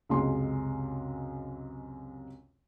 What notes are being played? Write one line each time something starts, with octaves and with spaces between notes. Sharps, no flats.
C#2 F#2 C3 G#3 C6